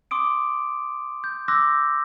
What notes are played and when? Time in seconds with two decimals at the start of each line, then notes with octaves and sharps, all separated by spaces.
0.11 C6 D6 D#6 D7
1.24 G6
1.48 C6 D6 E6 F#6 G6 A#6